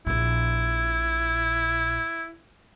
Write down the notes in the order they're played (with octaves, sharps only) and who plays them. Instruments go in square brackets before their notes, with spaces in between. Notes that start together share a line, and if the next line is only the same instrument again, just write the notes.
[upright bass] A#1 A#2 [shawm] E4